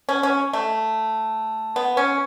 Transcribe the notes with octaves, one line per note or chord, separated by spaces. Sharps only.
C#4
C#4
A3
B3
C#4